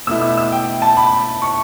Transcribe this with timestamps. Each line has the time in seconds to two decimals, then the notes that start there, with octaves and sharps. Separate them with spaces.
0.07 B2 A3 E4 E6
0.21 E6
0.37 E6
0.52 G5
0.82 A5
0.97 B5
1.42 C#6